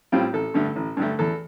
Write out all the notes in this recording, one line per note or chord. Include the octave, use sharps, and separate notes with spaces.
A2 G3 C4 F4
A1 A4
G2 D3 A3
A1
G2 D3 A3
E2 A4